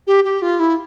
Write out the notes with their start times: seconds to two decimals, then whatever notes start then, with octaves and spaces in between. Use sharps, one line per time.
0.07 G4
0.24 G4
0.42 F4
0.60 E4